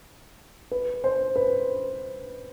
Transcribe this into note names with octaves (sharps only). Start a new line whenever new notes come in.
B4
C5
B4